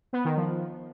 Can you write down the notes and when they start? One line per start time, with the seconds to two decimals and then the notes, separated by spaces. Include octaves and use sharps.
0.13 B3
0.25 D#3
0.37 F3